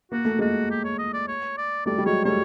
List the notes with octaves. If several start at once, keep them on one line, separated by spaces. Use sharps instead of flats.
A#3 F#4
A3
G#3 A#3 F#4
G4
C#5
D#5
D5
C#5
D5
G3 A3 D5
G3
F#3 G#3 C#5
G3 A3 C#5